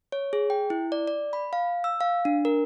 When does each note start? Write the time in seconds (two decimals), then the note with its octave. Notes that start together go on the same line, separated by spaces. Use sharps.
0.12 C#5
0.33 G#4
0.50 G5
0.70 E4
0.92 D5
1.07 D5
1.33 B5
1.53 F5
1.84 E6
2.01 F5
2.25 D4
2.45 A#4